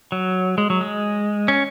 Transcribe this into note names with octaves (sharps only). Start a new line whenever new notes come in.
F#3
G#3
F#3
G#3
C#4